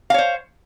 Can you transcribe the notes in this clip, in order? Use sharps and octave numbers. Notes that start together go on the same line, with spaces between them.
C5 C#5 F5